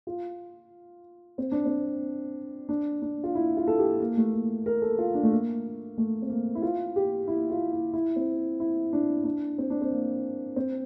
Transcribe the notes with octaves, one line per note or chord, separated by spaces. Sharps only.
F4
C4
D4
C4
D4
D4
F4
E4
F4
A4
G4
A#3
A3
A#3
A#4
A4
F4
D4
A3
A#3
A3
C4
A#3
E4
F4
G4
E4
F4
E4
E4
C4
E4
D4
D4
C4
D4
C4
A#3
C4